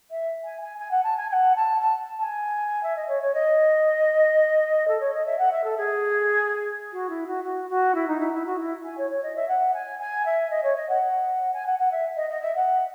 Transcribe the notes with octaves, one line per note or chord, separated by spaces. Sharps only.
E5
G#5
G#5
G#5
F#5
A5
G#5
G#5
F#5
A5
A5
A5
G#5
E5
D#5
C#5
C#5
D#5
A4
C#5
D#5
E5
F#5
E5
A4
G#4
F#4
E4
F#4
F#4
F#4
E4
D#4
E4
E4
F#4
E4
G#5
C#5
C#5
D#5
E5
F#5
G#5
G#5
E5
D#5
C#5
D#5
F#5
G#5
F#5
F#5
E5
D#5
D#5
E5
F#5